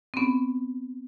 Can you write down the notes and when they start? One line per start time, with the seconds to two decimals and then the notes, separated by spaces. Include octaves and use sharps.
0.14 C4
0.17 B3 C#4